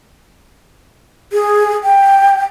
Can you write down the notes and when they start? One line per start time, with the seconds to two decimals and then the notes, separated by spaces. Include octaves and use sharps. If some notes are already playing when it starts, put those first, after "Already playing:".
1.33 G#4
1.84 G5